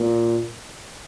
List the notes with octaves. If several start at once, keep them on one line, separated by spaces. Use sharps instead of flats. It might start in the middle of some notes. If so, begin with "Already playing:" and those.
Already playing: A#2